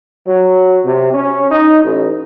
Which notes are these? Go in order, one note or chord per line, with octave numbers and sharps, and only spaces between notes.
F#3
C3
C#4
D#4
A1